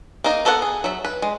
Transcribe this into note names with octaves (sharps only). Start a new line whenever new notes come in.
A#3 D#4 A#4 D#5
B3 A4 A#4 C#5 F#5
G#4
F#3 E5
B4
G#3